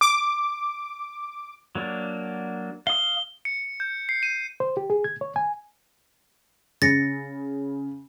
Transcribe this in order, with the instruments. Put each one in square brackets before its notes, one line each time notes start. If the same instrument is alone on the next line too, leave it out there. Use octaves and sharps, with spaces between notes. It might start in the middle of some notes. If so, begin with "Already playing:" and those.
[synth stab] D6
[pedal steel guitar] F#3 A#3 D4
[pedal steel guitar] F5 D#6 [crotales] G7
[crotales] C#7
G6
C7
D#7
[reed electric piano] C5
G4
G#4
G#6
C#5
G#5
[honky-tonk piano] C#3 [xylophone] A6 A#6 C#7